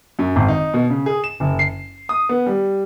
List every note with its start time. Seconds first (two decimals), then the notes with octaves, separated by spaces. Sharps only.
0.19 F#2
0.36 G#1
0.48 D#4
0.74 B2
0.90 C#3
1.06 G#4
1.24 E7
1.40 F#1
1.59 C7
2.09 D#6
2.29 B3
2.46 G3